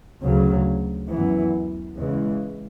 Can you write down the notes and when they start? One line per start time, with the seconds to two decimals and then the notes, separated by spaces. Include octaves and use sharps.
0.22 D2 C#3 F#3
1.09 F#2 E3 B3
1.96 E2 C#3 E3 G#3